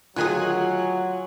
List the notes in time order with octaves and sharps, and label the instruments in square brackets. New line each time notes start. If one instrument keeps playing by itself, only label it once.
[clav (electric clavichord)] D2 D#3 G#4 [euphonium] F#3 [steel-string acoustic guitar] F4 [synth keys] F#5 G#5 F#6